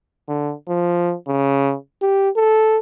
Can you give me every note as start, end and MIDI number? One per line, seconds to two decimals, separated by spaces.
0.29 0.53 50
0.68 1.14 53
1.28 1.75 49
2.02 2.29 67
2.37 2.79 69